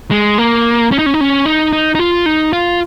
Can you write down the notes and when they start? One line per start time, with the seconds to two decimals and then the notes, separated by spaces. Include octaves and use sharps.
0.11 G#3
0.38 A#3
0.92 C#4
0.99 D#4
1.06 C#4
1.14 D#4
1.21 C#4
1.45 D#4
1.73 D#4
1.95 D#4
1.99 F4
2.26 D#4
2.53 F4